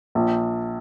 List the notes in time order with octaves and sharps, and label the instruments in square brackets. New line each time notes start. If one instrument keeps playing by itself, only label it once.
[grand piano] A#1